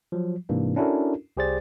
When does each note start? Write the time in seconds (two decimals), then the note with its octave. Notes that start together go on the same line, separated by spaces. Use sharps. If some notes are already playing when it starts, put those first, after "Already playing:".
0.12 F3 F#3
0.49 G#2 C3 E3 A#3 D4
0.76 C#4 D4 E4 F#4 A4 A#4
1.37 C2 G4 G#4 C5 D5 A6